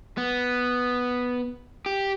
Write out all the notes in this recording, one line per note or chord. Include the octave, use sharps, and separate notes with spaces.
B3
G4